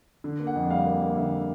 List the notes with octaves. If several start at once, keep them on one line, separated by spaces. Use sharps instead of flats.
D3
A#3
F#5
F2
G3 F5
A#3
A#3
D3 E5